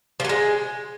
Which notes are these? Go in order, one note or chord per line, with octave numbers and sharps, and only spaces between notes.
F3 F#3 G#3